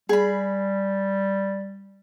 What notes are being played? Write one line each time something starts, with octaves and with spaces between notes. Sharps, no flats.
G3 G#4 B5